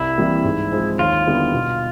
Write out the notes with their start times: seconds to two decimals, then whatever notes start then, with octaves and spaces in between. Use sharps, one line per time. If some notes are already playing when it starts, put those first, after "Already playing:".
Already playing: C2 E4
0.18 C3 E3 G3 A#3
0.44 G#2
0.72 F3 G#3 C4
0.99 D#2 F4
1.27 D3 G3 B3 E4
1.53 B2